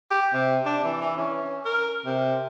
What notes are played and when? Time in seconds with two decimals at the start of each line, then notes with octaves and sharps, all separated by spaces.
0.11 G4
0.34 C3
0.65 D4
0.84 E3
1.01 E3
1.17 C#4
1.65 A#4
2.06 C3